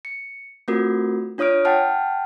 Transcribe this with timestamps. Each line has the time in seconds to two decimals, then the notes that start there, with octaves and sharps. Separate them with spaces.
0.05 C#7
0.68 A3 C4 F4 F#4 A#4
1.38 D4 F4 C#5 D#6 F6 D7
1.65 F#5 G5 A5 F6